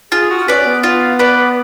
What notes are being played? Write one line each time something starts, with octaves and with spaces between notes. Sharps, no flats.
F4 G#4
F#4
C#4 B4 D5
B3
F4
B4 D5